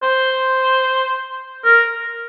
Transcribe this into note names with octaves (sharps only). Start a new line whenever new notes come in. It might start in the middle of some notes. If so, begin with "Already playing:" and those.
C5
A#4